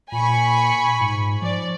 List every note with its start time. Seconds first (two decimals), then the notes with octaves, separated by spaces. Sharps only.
0.12 A#2 G#5 B5 C#6
1.01 G#2
1.42 F3 D5